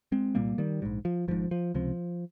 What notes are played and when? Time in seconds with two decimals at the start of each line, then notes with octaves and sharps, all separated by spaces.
0.12 G#3 C4
0.35 C2 A#2 G3 A#3
0.58 D#3 G3
0.82 A#1 G#2
1.05 F3
1.28 G#1 G#2 F3
1.51 F3
1.74 C#2 C3 F3